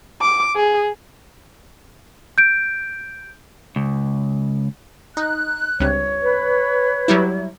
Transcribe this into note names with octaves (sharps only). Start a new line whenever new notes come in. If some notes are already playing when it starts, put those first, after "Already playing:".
D6
G#4
G6 D7
C#2
D#4 F#6
C#2 G2 C3 C#5
B4
F#3 G3 E4